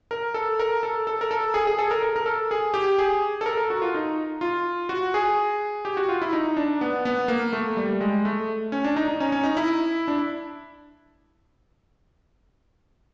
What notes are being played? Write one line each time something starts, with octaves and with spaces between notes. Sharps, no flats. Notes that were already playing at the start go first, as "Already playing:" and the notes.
A#4
A4
A#4
A4
A4
A#4
A4
G#4
G#4
A4
A#4
A#4
A#4
A4
G#4
G4
G#4
A4
A#4
A4
F#4
F4
D#4
F4
F#4
G#4
G4
F#4
F4
E4
D#4
D4
B3
B3
A#3
A3
G3
G#3
A3
C#4
D4
D#4
D#4
C#4
C#4
D#4
E4
D4